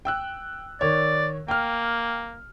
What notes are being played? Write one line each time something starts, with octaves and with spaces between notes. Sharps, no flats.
G5 E6 F#6
D#3 C#5 D5
A#3 G5 F6